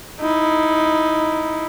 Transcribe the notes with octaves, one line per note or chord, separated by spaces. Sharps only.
D#4 E4